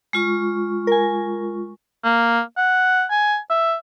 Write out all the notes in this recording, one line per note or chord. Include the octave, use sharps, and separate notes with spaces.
G#3 F4 C#6
A#4 G#5
A#3
F#5
G#5
E5